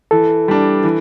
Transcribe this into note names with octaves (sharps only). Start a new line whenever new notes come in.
E3 A4
G3 D4
E3